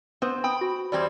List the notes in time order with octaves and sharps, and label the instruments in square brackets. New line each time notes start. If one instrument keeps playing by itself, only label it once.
[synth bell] B3 B4 C5 [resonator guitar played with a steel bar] C4
[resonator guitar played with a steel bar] G5 [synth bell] B5 D#6
[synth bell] F#4 B5
[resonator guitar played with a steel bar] E2 G3 C4 [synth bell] D5 G#6